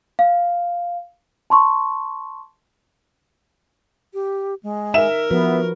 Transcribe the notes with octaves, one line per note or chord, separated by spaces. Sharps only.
F5
A5 C6 C#6
G4
G#3
D#4 A#4 E5 E7
F3 B3 F#4 B4